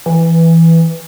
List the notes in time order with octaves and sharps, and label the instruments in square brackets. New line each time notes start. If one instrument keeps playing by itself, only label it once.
[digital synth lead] E3